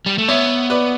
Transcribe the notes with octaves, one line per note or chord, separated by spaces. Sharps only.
G3
A3
B3 C#5 E5
B4 D5